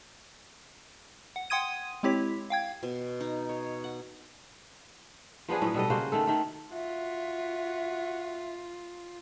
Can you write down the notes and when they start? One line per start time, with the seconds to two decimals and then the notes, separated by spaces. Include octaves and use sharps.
1.36 F#5
1.50 F#5 G5 C6 D#6 G#6 D#7
2.03 G#3 C4 E4 G4 C#5 B6
2.50 F5 G5 G#6
2.83 B2
3.20 D#4
3.49 C#5
3.84 F#5
5.48 F3 B3 D4 G#4
5.61 A2 F#3 B3
5.74 B2 G3 A4 D#5
5.90 C#3 A#3 F#4 C5
6.12 D#3 A3 A4
6.27 D#3 A3
6.72 F4 F#4 E5